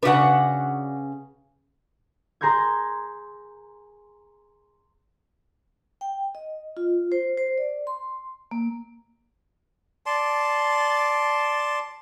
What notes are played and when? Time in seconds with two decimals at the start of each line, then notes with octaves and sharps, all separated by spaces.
0.03 C#3 D4 F#4 B4 F#5
2.41 G#4 A#5 C6 G6 G#6
6.01 G5
6.35 D#5
6.77 F4
7.12 C5
7.37 C5
7.58 D5
7.87 C6
8.51 A#3
10.06 D5 A5 C6